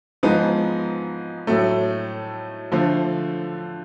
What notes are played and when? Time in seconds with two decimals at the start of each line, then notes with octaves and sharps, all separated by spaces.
0.23 G#2 F3 G#3 B3 D#4
1.47 A2 F#3 A3
2.72 D3 F3 A3